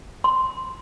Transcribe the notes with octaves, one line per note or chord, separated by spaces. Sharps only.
C6